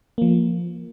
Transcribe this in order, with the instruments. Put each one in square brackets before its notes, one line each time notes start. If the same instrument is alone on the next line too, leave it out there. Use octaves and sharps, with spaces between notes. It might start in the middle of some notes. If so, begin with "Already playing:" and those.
[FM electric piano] F3 A#3